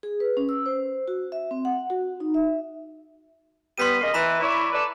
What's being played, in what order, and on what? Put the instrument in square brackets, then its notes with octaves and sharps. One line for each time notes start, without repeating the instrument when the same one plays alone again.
[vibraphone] G#4
B4
C#4
E6
C5
F#4
E5
C4
F#5
F#4
D#4
E5
[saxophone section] G3 B3 [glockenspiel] C6 B6 D#7
[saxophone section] C#3 A#3 D#5
[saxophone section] E3 [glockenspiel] A#5 B5 E7
[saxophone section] E4 C#5 D5
A4 B4 D5